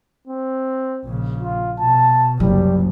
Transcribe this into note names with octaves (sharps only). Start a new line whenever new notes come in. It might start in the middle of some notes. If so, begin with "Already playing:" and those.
C4
A#1 C#3
F4
B2 A5
F#1 C2 F#3 G3